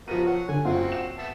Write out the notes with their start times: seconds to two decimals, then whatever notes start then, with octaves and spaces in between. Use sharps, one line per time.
0.08 F3 B3 F#4 A#4 D#7
0.26 C#5 F#5
0.49 D3 G#5
0.65 F#1 C4 F4 F#4 F#5
0.92 E7
1.18 B3 E5 A5